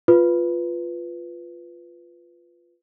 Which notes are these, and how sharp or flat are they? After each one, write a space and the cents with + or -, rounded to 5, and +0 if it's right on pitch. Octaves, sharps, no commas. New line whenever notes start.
F4 +0 B4 +0